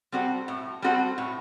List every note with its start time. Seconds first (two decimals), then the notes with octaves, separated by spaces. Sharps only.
0.12 G3 C4 F#4 A4
0.48 A2
0.82 G3 C4 F#4 A4
1.18 A2